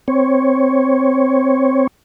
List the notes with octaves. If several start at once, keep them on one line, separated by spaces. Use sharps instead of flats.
C4 C#5